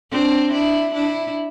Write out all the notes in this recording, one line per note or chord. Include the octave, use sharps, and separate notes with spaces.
C4 D4
D4 E4
D4 E4